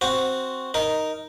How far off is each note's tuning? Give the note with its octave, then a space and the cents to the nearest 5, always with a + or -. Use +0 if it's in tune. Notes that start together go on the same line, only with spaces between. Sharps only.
C4 +0 F#4 +0
D#4 +0 A#4 +0